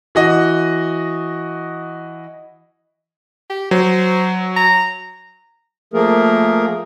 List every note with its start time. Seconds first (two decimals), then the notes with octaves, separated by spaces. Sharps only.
0.15 E3 F#4 D#5
3.50 G4
3.71 F#3 C5
4.56 A#5
5.93 F3 A3 A#3 G#4 A#4